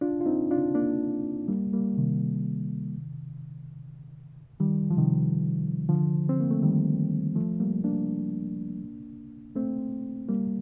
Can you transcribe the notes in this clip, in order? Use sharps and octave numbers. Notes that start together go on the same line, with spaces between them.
D4 F4
F4
C4 D#4
D4 F4
A#3 D4
G3 A#3
G3 A#3
C3 D#3
D#3 G3
F3
C3 D#3
D3 F3
C4
A#3
A3
D#3 G3
F3 A3
G3 A#3
A#3 D4
A3 C4
G3 A#3